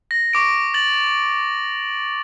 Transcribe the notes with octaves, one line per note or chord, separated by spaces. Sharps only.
A#6
C#6 D6 D7
A6 F#7